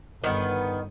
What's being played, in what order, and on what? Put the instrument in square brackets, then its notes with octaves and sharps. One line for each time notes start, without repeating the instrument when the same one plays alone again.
[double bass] G1 [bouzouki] D#3 B3